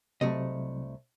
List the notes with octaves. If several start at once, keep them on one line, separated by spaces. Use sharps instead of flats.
C2 C3 F#3 A3 D#5